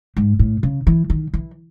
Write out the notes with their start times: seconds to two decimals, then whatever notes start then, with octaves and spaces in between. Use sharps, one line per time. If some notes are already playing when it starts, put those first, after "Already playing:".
0.17 G#2
0.39 A2
0.63 C#3
0.87 E3
1.10 D#3
1.34 E3